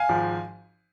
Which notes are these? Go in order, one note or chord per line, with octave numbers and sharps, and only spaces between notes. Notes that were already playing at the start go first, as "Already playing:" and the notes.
Already playing: F5 G#5
G#1 G#2 F3